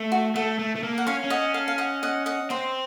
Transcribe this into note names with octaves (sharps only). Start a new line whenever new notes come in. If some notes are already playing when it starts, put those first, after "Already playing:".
Already playing: A3
F#4
A3 A4
A3
A3
A#3
F#5
C#4 C#5 F5
C#4
D#5 F#5
F5 A5
F5
D#5 F#5
D#5 F#5
D#5 F#5
C4 C5 D#5